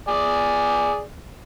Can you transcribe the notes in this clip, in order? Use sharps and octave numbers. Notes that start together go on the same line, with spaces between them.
G#4 D5 G#5